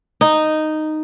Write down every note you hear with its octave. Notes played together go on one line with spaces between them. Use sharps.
D#4